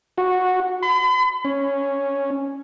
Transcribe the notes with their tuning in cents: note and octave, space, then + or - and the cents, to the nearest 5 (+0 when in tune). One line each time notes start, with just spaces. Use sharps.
F#4 -15
B5 +45
C#4 +0